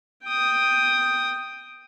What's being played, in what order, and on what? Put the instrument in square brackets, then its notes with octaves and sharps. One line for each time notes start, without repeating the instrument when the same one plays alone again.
[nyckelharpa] G5 D#6